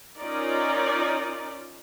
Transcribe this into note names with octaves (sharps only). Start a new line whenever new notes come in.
C#4 D#4 F4 A#4 D5